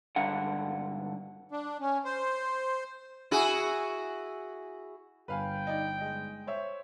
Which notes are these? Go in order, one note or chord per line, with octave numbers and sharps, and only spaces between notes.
C#2 G2 D3 F#5
D4
C#4
C5
E4 F#4 G#4
G1 B4 F5 G5 G#5
D#4 D5
G#3 D#5
C5 C#5 E5